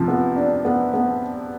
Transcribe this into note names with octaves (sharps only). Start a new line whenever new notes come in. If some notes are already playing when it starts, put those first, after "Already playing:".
Already playing: C3 F3
B3
D4
B3
B3